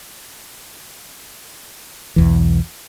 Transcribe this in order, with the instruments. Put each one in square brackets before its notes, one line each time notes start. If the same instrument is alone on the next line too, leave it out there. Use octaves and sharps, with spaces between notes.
[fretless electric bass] B1 E2 E3